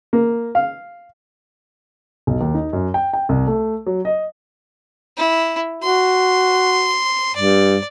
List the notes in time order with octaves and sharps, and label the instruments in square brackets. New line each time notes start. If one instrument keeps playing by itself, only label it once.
[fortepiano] A#3
F5
[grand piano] B1
D#2
D#4
F#2
G5
G5
C2
A3
F#3
D#5
[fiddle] E4
[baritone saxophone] F#4 [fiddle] C6
[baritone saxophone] G2 [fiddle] D5